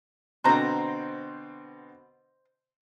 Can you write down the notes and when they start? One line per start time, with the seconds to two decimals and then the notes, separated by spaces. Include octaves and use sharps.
0.44 B2 D3 C4 C5 A#5